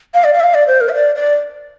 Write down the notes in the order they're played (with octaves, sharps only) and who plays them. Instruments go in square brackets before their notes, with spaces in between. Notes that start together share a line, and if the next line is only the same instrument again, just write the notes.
[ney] F5
D5
F5
E5
F5
D5
C5
A#4
E5
D5
D5